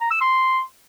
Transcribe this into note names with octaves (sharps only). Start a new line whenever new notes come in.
A#5
E6
C6